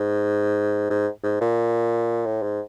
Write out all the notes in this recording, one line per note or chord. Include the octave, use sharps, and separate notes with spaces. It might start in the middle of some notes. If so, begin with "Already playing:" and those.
Already playing: G#2
G#2
G#2
A#2
A2
G#2